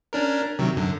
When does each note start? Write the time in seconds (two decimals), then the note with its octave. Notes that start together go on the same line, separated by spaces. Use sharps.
0.13 C#4 D4 A#4
0.59 C3 D#3 F#3
0.76 F#2 D3